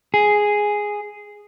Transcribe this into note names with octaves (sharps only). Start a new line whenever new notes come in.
G#4